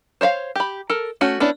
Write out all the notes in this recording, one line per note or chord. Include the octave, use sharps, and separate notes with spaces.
C5 C#5 E5 F5
G4 B5
A4 A#4
A3 C#4 F#4
B3 C#4 D4 E4